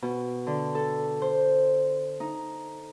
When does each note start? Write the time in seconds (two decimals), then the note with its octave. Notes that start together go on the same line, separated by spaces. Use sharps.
0.02 B2
0.47 D3
0.75 A4
1.22 C5
2.20 D#4